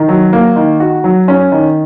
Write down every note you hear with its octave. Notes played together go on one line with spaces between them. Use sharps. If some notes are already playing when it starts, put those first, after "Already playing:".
Already playing: D#3
F#3
A#3
D#3
F#4
F#3
C#4
D#3